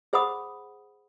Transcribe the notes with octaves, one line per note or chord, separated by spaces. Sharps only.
G#4 C5 F#5 B5 D#6